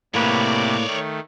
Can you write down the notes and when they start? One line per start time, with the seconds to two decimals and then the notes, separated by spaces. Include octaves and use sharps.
0.14 A2 C3 A#3 B4 C#5 D5
0.86 D#3 A3